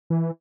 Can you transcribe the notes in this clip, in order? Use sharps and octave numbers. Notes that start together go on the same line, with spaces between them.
E3